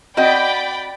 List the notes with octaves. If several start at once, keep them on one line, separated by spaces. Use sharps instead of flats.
C4 F#4 D5 D#5 G5 B5